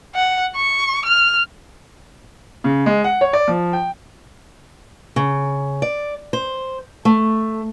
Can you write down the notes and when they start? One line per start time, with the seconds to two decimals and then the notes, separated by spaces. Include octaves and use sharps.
0.15 F#5
0.56 C#6
1.06 F6
2.64 C#3
2.86 G#3
3.04 F#5
3.21 C#5
3.33 D5
3.48 F3
3.73 G5
5.16 C#3
5.82 D5
6.33 C5
7.05 A3